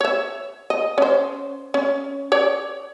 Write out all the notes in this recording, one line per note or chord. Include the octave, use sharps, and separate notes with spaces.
C#5 E5
D#5
C#4 C5
C#4
C#5 D5